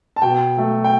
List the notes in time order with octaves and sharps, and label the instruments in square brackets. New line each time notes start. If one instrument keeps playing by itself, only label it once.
[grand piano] A5
B2 G5
F#3 A3
G5